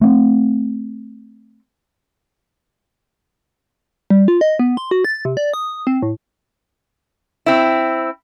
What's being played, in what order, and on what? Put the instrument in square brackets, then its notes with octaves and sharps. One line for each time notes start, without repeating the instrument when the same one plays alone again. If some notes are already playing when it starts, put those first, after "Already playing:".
[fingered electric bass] A3 C4
[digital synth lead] G3
F4
D#5
B3
C6
F#4
A6
C3
D5
D#6
C4
A2
[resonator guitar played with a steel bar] C4 E4